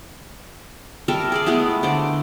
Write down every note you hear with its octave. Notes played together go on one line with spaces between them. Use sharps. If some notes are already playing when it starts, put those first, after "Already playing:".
G3 A4 A#4 E5
G#4 A4 D5
G#3 A3 B3 E4
D3 C5 D5